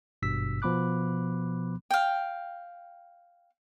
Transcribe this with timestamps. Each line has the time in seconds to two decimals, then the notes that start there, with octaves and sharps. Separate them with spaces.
0.22 G#1 G2 B2 E6 B6
0.62 B2 F3 B3 B5 D6 F#6
1.91 F5 G5